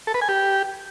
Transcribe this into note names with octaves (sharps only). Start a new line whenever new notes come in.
A4
B4
G#5
G4